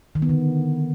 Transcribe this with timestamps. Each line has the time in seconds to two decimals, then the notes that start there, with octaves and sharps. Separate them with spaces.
0.15 D#3
0.22 B3
0.29 D3